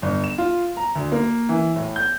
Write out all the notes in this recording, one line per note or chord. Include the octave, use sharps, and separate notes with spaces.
G1
E7
F4
A#5
D2
A#3
E3
A2
G6